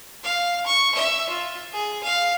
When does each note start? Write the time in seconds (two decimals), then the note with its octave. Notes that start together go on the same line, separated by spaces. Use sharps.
0.24 F5
0.66 C#6
0.95 E5
1.29 F4
1.72 G#4
2.03 F5